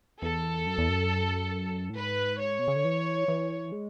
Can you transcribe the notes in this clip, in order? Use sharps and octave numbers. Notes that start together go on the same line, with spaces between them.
E2 A4
F#2
E2
F#2
A2
G#2 B4
C#5
B2
C#3
D3
E3
E3
G#3